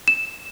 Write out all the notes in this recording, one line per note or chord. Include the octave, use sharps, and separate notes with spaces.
E7